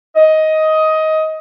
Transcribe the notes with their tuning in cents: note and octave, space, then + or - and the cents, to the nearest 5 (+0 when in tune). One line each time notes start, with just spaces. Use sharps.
D#5 +15